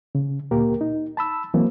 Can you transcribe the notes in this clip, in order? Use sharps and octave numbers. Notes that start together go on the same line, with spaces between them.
C#3
D2 A#2 A#3 G4 A#4
D#4
A5 B5 E6
E3 F#3 A#3 C4